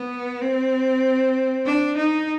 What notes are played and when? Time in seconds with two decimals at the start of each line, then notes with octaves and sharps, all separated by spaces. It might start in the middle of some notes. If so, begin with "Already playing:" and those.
Already playing: B3
0.41 C4
1.66 D4
1.97 D#4